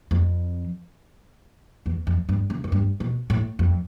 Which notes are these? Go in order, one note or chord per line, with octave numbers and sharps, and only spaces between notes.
F2
E2
F2
G2
C#3
F#2
G2
B2
A2
F2